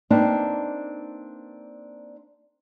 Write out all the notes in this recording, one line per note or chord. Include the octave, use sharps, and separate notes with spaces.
A#3 C4 D4 D#4 B4 A5